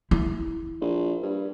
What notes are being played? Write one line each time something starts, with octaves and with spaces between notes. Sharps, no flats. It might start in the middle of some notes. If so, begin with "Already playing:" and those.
E4
A#1
G2